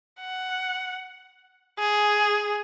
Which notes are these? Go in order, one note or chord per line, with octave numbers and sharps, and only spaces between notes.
F#5
G#4